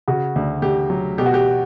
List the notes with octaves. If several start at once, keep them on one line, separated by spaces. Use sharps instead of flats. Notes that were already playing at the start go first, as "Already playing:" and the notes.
C#3 F#4
D2
D2 G4
F#3
B2 G4
F#4
G4